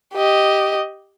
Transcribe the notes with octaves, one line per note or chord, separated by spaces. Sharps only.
G4 D#5